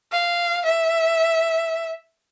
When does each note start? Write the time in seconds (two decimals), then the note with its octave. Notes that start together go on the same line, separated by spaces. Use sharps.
0.12 F5
0.65 E5